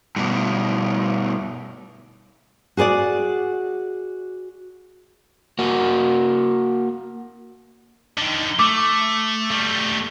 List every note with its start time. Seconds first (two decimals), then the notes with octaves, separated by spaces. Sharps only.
0.16 G2 B2
2.77 F#4 G#4 B4 D5 F#5
5.59 A#3 F#4
8.18 D3 D#3
8.59 A3 D6
9.51 G3 A3